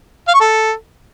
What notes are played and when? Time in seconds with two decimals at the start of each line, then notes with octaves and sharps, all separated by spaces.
0.28 F5
0.34 C#6
0.40 A4